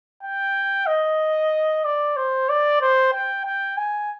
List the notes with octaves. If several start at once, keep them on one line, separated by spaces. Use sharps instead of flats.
G5
D#5
D5
C5
D5
C5
G5
G5
G#5